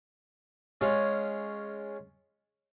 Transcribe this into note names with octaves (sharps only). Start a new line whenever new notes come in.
G#3 C#4 F4